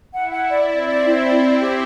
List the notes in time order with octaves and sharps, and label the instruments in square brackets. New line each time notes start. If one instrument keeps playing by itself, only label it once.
[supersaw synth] E4 [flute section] F#5
[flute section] F#5
D5
[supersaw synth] C4 [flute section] D5
[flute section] D5
E4
D5
D5
G4